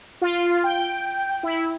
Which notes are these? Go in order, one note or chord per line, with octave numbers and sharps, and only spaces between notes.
F4
G5
E4